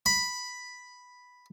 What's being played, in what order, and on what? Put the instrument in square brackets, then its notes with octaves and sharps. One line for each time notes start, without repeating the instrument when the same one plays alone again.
[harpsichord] B5